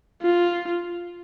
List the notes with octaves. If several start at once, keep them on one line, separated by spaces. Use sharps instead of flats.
F4